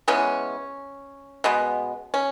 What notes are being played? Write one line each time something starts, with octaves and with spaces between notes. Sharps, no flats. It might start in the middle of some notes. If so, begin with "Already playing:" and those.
E3 G#3 B3 C#4
B2 G#3 B3
C#4